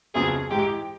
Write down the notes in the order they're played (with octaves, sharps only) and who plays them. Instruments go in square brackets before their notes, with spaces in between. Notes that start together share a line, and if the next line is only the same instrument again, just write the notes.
[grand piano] F2 C#3 F#3 B3 [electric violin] G#4
[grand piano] G#2 E3 G#3 [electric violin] G4